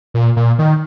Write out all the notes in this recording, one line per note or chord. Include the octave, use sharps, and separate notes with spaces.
A#2
A#2
D#3